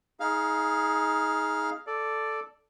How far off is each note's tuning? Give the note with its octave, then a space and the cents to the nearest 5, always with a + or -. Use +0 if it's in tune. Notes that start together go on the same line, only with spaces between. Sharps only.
D#4 +25 G#4 +0 F5 +0
A4 +0 D5 +0